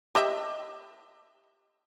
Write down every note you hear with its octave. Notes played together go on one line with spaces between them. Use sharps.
G4 D#5 E5